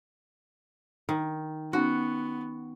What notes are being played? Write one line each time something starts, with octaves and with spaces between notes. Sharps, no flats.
D#3
B3 C#4 D#4 F#4